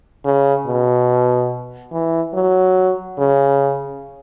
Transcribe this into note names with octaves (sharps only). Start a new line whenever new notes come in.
C#3
B2
E3
F#3
C#3